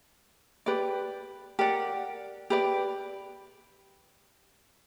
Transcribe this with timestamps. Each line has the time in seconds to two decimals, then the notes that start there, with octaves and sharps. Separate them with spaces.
0.66 G4 B4 D5
1.59 G4 A#4 D5 F#5
2.50 G4 B4 D5